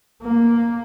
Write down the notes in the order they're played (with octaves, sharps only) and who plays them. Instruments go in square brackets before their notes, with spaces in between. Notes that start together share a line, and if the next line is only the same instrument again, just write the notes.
[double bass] A#3